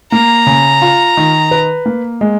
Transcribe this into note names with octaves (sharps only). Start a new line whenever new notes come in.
A#3 A#5
C#3
F4
D#3
B4
A#3
G#3